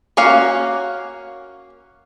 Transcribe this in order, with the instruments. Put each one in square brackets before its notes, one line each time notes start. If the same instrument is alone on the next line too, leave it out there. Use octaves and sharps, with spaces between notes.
[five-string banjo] A#3 C#4 F#4 C#5 F5